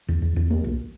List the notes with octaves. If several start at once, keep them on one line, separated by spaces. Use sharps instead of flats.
E2
E2
E2
A#3
B1